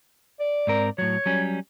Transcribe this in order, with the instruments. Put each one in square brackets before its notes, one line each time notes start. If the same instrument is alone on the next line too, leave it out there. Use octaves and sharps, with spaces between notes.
[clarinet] D5
[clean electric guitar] G#2 C4 A#4
[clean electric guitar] A2 F#3 [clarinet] C#5
[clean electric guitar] F#3 G3 C#4